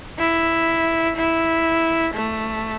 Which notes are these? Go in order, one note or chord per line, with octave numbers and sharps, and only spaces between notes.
E4
E4
A3